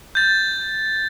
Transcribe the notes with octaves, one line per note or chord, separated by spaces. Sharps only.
G6 A6